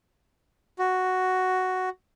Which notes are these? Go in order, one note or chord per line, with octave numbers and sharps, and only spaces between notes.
F#4